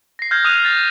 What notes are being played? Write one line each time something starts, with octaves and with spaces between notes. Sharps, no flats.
A#6 C7
F6 G6 G#6 A#6 C7
D#6 F#6 D#7 F7
A6 A#6 F7